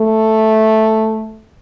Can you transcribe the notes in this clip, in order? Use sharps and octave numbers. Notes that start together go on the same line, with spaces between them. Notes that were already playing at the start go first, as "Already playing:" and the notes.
Already playing: A3